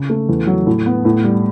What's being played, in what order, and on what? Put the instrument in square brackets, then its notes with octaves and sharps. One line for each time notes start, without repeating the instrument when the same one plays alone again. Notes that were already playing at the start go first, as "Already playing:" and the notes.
Already playing: [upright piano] C#3
A3
E2
F#3
A2
B3
A2
G3